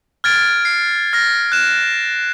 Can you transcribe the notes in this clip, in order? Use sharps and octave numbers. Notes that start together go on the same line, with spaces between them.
F6 G#6 A6 D7
C7
F6 A6 A#6
F#6 E7